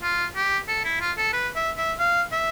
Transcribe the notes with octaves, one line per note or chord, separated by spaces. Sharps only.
F4
G4
A4
E4
F4
A4
B4
E5
E5
F5
E5